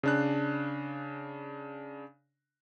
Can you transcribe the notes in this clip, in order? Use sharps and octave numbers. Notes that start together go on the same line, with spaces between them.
C#3 D4 F#6